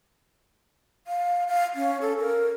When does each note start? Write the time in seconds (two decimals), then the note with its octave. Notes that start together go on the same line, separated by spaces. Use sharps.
1.07 F5
1.48 F5
1.75 C#4
2.01 A4
2.19 A#4